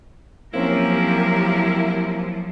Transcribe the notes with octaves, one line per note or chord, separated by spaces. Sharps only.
F3 F#3 A#3 C4 C#4 E4 G4 A#4